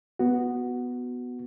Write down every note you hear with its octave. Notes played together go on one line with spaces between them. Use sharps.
B3 F#4